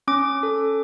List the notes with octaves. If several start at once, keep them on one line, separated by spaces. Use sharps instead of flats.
C#4 D6
A4